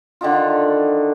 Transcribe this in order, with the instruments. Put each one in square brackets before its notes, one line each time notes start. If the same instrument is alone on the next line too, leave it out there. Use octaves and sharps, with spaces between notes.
[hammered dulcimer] D3 D#3 D#4 F4